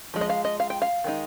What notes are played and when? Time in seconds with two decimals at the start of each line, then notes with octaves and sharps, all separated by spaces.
0.14 F3 G#3
0.21 D#5
0.29 F5
0.45 D#5
0.60 F5
0.70 G5
0.82 F5
1.04 D#3 G#3 D#4